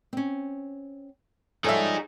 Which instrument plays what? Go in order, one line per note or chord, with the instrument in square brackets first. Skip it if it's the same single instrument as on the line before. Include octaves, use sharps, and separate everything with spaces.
[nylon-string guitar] C4 C#4
[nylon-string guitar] F3 G3 [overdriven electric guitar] D#4 G#4 [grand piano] A4 C#5 E5